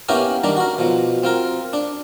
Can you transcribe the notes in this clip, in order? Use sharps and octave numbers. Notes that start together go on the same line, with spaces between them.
A#3 B3 C#4 E4 G4 A#4
D#3 G3 A#3 D4
F#4 A#4
B2 F3
C4 F4 A#4
D4